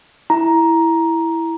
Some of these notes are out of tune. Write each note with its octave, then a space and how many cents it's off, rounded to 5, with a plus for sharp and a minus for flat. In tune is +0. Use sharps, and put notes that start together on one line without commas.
E4 +0 A#5 +10